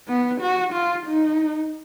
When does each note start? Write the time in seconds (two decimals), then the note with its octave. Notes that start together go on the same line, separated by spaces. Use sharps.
0.08 B3
0.41 F#4
0.73 F4
1.06 D#4